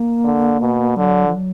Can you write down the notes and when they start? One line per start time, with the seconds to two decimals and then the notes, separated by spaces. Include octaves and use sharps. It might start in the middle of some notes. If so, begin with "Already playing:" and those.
Already playing: A#3
0.24 D3
0.60 B2
0.96 D3 F#3
1.27 F3
1.34 F#3